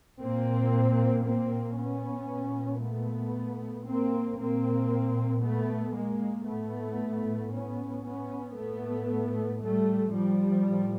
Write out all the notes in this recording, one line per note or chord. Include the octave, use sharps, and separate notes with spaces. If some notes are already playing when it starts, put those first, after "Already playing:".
A#2 A#3 C4
A#3 C4
B3 C#4
A#2
A3 B3
A#3 C4
A#2 A#3 C4
A3 B3
G#3 A#3
A2 A3 B3
B3 C#4
B3 C#4
A2 A3 B3
G3 A3
F3 G3
A2